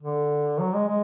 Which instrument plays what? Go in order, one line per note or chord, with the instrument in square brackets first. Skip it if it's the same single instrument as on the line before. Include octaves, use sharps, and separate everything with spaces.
[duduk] D3
F#3
G#3
G#3